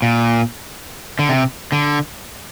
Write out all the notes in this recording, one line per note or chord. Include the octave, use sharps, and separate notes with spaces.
A#2
D3
C3
D3